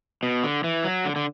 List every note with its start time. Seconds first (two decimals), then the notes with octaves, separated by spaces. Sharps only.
0.23 B2
0.44 D3
0.64 E3
0.84 F#3
1.05 D3
1.16 D3